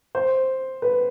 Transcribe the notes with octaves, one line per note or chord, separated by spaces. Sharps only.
C5
B4